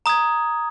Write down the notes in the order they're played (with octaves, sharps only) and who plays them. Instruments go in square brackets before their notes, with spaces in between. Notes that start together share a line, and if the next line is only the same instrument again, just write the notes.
[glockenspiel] A#5 D#6 G#6